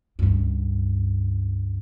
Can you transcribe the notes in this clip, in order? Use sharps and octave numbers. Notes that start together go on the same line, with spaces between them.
C#2 G2